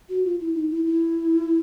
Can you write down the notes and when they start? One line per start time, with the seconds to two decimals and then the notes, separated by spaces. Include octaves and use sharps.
0.09 F#4
0.24 F4
0.40 E4
0.55 D#4
0.70 E4
0.86 E4